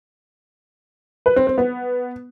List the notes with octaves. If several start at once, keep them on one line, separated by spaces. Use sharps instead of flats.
B4
C4
C4
B3